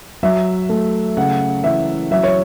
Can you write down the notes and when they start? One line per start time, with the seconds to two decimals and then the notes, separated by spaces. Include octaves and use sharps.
0.23 F#3 E5
0.69 A3
1.17 C#3 F#5
1.64 E3 E5
2.11 F#3 E5
2.23 C#5